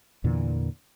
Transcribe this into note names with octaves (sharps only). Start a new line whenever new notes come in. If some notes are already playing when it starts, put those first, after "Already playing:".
E2 A#2 D3 E3